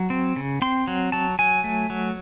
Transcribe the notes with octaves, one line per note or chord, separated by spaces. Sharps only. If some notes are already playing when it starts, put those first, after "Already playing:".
Already playing: F#3
C4
C#3
C4 C6
F#3
F#3 A5
F#3 G#5
A3
F#3